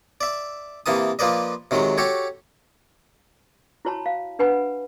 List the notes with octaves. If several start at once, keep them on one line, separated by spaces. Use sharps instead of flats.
D5 E5
C3 E3 A#3 A5 D#6
F3 A#3 B4 D5 D#5
C3 D#3 F#3 G#3
F#4 G4 A4 C#5
E4 F#4 C#5 A5 B5
F5
D4 B4 F#5 G#5 B5